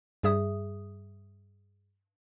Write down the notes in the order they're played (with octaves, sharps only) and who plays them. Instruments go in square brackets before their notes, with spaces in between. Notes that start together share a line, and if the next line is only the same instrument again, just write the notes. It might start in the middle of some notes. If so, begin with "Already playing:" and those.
[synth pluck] G2 G3 G#4 E5 D#6